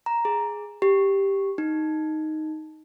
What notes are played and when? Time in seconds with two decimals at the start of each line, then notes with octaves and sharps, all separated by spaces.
0.06 A#5
0.25 G#4
0.82 G4
1.58 D#4